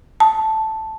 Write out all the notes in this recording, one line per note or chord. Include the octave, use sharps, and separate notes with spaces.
A5